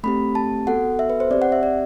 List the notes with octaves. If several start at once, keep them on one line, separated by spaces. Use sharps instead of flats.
A3 C4 G4 B5
A5
B3 F#4 A4 F#5
E5
B4
C5
C4 G4 D5
F#5
E5
D5